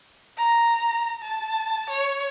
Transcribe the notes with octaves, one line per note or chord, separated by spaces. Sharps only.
A#5
A5
C#5